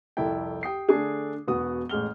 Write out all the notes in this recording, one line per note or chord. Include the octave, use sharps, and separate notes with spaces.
C2 F2 E4 A4 G5
G4 G5 D#6 C7
D3 A3 D4 G#4
E1 B3 F#4 D#6
A1 G#3 F6 G7